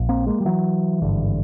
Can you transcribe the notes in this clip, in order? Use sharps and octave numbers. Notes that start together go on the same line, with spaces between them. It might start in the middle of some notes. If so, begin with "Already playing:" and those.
Already playing: A#1
A#3 C4
G#3 A#3
G3
E3 F#3
G#1 G2 D3